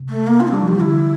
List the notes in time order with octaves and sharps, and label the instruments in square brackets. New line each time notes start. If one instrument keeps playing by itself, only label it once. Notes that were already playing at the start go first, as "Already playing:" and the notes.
Already playing: [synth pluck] C3
[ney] A3
A#3
F4
C4
[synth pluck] G3 [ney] D4
[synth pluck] F3
[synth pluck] E3 [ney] G4
[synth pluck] D3 [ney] E4